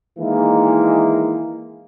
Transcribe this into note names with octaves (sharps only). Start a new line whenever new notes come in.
D#3 E3 G#3 A#3 E4